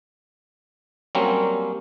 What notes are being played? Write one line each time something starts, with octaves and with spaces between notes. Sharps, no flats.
F#3 G3 A#3 C4 C#4